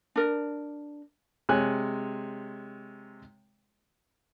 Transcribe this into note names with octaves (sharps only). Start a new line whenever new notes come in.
D4 A#4
C3 G#3 C#5 G#5 F#6